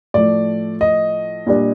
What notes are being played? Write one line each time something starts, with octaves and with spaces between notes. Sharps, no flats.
A2 F3 A3 D5
D#5
A#2 G3 D4